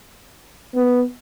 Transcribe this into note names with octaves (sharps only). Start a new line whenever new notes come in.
B3